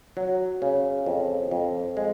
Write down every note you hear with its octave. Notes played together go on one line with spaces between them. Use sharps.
F#3
C#3
F2
F2
G#3